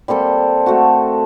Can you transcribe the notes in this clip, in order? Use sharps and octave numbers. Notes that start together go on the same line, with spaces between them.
G3 A#3 C4 A4
A3 C4 F#4